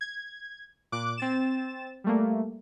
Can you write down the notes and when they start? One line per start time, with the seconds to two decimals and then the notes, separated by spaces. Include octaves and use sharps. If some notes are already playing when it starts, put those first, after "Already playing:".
0.01 G#6
0.92 A#2 D6 F#6
1.17 C4 A6 E7
2.04 G3 A3 A#3